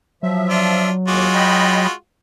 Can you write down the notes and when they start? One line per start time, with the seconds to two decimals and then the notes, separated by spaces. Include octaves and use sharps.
0.23 F3 F#3 E5
0.50 D4 F4
1.08 D#2 G#3 F4 F#4 D6
1.35 D#5 G5 B5